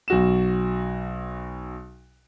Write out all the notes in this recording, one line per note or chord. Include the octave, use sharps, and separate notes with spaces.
B1 F#4 E7